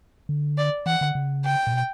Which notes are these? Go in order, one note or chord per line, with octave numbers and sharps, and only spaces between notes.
D3
D5
E3 F#5
D3
C#3
G5
A#2
B2